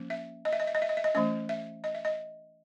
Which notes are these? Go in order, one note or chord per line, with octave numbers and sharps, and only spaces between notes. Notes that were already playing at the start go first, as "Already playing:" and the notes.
Already playing: F3 A#3 C#4
E5
D#5
E5
D#5
E5
D#5
E5
D#5
E5
D#5
E3 A3 C#4 D#5
E5
D#5
E5
D#5